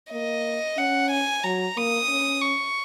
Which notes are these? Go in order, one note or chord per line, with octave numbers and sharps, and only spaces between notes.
A#3 D#5
C#4 F#5
G#5
F#3 A#5
A#3 D#6
C#4
C#6